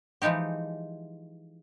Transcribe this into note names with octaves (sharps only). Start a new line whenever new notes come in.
E3 F3 G#3 D#4 G4